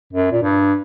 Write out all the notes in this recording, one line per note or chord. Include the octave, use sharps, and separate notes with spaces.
F#2
A#2
G2